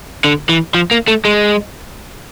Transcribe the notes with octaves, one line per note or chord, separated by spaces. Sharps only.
D3
E3
F3
A#3
A3
G#3